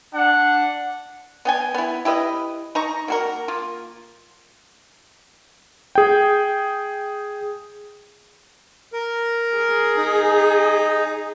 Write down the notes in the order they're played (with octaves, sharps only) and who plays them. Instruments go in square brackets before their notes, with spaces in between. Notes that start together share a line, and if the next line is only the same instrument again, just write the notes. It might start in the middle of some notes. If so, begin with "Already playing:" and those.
[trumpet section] D4 F#5
[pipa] B3 G5 G#5
B3 E4
E4 G4 B4 D#5
D#4 A#5 C#6
A#3 F#4 A#4
A#3 F4
[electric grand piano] G#4 G5
[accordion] A#4
[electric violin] G#4
[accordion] D#4